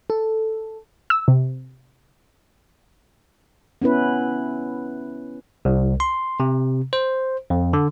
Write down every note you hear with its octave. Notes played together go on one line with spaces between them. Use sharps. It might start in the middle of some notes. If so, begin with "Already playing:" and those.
A4
E6
C3
B3 C#4 E4 B4
C2
C6
C3
C5
F2
D3